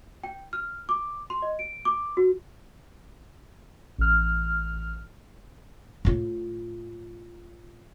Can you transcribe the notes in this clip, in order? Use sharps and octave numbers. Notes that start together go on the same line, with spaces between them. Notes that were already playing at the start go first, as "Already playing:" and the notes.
G5
F6
D6
C6
D#5
D7
D6
F#4
A1 F6
A2 F4